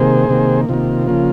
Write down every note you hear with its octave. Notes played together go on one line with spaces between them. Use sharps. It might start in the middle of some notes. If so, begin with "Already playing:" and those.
Already playing: C3 D#3 A#3 G#4 C5
C3 D#3 A#3
C3 D#3 A#3 F4
C#3 F3 A#3